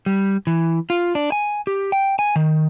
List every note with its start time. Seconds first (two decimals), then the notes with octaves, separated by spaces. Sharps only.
0.06 G3
0.47 E3
0.90 F4
1.15 D4
1.32 G#5
1.67 G4
1.92 G5
2.19 G#5
2.36 D#3